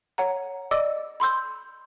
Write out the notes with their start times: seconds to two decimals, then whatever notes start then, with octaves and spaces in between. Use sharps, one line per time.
0.18 C#5 F#5 A#5
0.71 D5 D#5 D6 E6
1.20 B5 C6 E6 G6